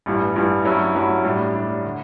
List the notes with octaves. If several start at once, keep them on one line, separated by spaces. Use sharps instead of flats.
A1 G2 E3 G3
A1 G2 E3 G3
G2 F#3 C#4 E4
G2 F#3 C#4 E4
A2 G3 D4
A2 G3 D4
D3